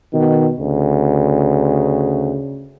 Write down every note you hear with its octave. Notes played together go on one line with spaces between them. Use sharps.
B2 D#3
D2 C#3